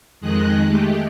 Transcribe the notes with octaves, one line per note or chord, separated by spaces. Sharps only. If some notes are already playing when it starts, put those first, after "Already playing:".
F2 D#3 G#3 D#5 F#6
G#3 A3 G4